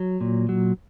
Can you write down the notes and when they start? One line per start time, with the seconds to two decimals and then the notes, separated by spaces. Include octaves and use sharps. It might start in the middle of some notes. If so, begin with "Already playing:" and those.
Already playing: F#3
0.21 A#2
0.49 F#3